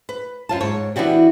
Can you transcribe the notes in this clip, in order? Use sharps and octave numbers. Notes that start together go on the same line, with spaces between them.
B4
F#2 F4 A5
G#2 C#5
E3 B3 D4 F#4 G4